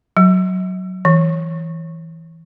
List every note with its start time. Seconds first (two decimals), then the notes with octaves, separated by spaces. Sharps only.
0.17 F#3
1.05 E3